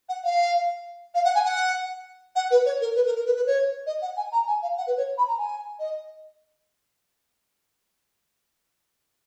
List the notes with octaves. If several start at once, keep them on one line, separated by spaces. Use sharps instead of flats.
F#5
F5
F5
F#5
G#5
F#5
F#5
B4
C#5
A#4
B4
A#4
A#4
B4
B4
C#5
D#5
F#5
G#5
A#5
G#5
F5
F#5
B4
C#5
B5
A#5
G#5
D#5